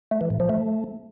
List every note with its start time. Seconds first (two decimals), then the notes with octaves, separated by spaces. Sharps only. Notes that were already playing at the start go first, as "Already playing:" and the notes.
0.11 A3
0.21 E3
0.30 A2
0.40 F3
0.49 A3